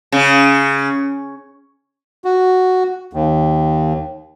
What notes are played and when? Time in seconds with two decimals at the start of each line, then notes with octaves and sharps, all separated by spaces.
0.12 C#3
2.24 F#4
3.13 D#2